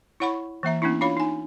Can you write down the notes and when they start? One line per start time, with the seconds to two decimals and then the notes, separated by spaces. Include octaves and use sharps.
0.20 E4 C#5 F#5 B5 C#6
0.63 E3 A#3 E5 A#5
0.82 A#3 B3 C#4 D4 E4
1.01 D4 F4 C#5 F5 B5
1.17 D#4 G#5